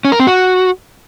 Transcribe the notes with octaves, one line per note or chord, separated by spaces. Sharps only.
C#4
A#4
C4
F#4